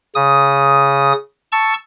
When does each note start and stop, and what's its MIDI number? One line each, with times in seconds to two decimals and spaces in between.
0.15 1.13 49
0.15 1.13 87
1.52 1.74 81
1.52 1.74 85
1.52 1.74 88